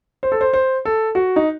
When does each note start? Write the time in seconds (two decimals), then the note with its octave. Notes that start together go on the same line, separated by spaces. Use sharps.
0.23 C5
0.32 A4
0.41 C5
0.53 C5
0.85 A4
1.15 F#4
1.36 D#4